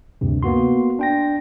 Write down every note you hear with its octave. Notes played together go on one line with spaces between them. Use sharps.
D2 G2 C3
A#3 B3 F#4 C6
D4 G5 A#6